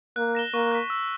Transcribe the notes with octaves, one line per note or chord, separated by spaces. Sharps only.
A#3 F#6
A#6 E7 G7
A#3 C#6
F#6 B6
E6